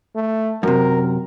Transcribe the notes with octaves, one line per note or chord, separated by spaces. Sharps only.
A3
F#2 C3 A#4